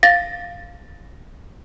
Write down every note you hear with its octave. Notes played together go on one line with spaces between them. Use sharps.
F5 A6 A#6